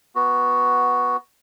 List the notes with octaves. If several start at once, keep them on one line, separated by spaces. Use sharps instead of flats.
B3 F#4